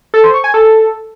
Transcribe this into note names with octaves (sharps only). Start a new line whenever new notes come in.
A4
C5
C#6
G#5
A4